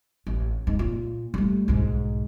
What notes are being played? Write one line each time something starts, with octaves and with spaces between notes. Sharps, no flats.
A1
G#2
A#2
G3 A3
B1 G#2